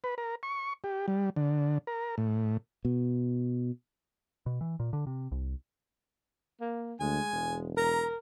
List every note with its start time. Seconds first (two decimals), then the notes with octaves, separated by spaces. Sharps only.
0.04 B4
0.18 A#4
0.43 C#6
0.84 G4
1.08 G3
1.36 D3
1.87 A#4
2.18 A2
2.85 B2
4.46 B2
4.61 E3
4.80 A#2
4.93 D3
5.07 C3
5.32 C2
6.61 A#3
7.00 D2 G#3 G#5
7.32 E1
7.77 A#4 A#5